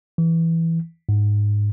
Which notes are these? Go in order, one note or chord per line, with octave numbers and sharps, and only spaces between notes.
E3
G#2